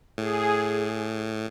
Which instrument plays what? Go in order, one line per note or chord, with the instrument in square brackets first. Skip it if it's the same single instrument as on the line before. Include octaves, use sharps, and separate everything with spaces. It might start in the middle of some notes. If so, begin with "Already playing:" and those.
[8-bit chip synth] A2 [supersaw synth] G#4